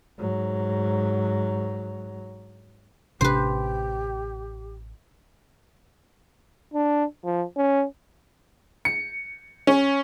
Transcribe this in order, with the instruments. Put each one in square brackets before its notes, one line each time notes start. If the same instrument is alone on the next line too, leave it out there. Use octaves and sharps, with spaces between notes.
[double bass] G#2 F#3
[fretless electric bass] A1 C3 D4 [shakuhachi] G4 [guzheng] B4 C5
[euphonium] D4
F3
C#4
[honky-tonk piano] C#7
C#4